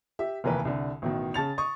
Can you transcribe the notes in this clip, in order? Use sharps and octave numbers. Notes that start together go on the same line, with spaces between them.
G4 E5
F1 D#2 E3 A#4 B4
C2 D3
A1 B2 D#3
C#3 A5 A6 F7
C#6 D#6